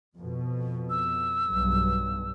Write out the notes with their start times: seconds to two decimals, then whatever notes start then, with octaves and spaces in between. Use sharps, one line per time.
0.17 F2 B2
0.90 E6
1.49 B1 G2